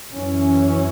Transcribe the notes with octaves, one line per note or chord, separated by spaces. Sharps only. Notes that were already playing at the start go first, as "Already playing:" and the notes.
F#2 E3 C#4